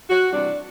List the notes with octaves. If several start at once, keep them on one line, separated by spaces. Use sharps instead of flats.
F#4
C3 E3 G3 D4